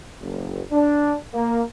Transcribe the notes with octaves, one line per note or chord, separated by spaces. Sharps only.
F#1
D4
A#3